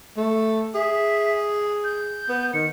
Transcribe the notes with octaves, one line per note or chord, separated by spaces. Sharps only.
A3
G#4 E5
G6
B3
D#3 C#7